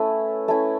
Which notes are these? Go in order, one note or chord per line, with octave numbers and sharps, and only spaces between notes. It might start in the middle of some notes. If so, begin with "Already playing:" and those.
Already playing: A3 C#4 E4 A4 B4
A3 C#4 E4